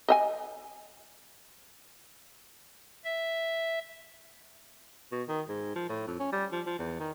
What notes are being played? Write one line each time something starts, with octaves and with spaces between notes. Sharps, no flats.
D#5 E5 G#5
E5
B2
D#3
G#2
F3
A2
F2
C#4
G3
F3
F3
E2
D#3